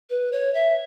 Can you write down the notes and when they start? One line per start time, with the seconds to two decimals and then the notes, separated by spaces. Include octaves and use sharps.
0.10 B4
0.32 C#5
0.54 E5